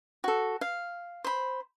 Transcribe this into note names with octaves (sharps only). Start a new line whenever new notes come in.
F#4 A4
F5
C5 B5